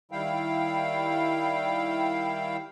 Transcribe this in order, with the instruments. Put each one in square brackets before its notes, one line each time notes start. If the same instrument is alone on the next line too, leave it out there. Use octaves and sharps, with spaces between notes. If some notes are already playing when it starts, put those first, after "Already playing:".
[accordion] D#3 G3 E4 F5 G5